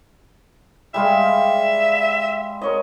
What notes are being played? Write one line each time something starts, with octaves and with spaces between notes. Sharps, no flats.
G3 G#3 E5 F5
A#4 C#5 D#5